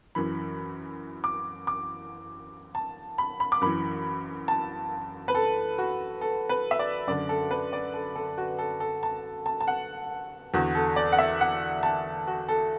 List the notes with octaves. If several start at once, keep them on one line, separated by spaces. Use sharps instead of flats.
F#2 E3 B5
D6
D6
A5
B5
B5
D6
F#2 E3 B5
A5
B4
A4
F#4
A4
B4
E5
D5
F#2 D3 D5
A4
B4
D5
A4
A4
F#4
A4
A4
A5
A5
A5
F#5
E2 D3 F#4
A4
D5
F#5
E5
F#5
A5
F#4
A4